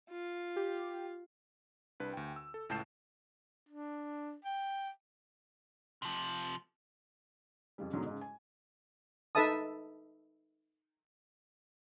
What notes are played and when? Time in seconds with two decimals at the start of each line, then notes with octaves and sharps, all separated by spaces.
0.11 F4
0.56 G4
2.00 C2 D4 B4
2.14 D2 G5
2.36 E6
2.54 A4
2.69 C#2 A2 A5 G6 C7 E7
3.68 D4
4.45 G5
6.02 C3 F3
7.78 F2 C#3 G3
7.93 G#2 B2 D3 F#3 D#4
8.06 G#2 C#3
8.21 G#5
9.35 D#4 A4 B4 E5 A5 D#6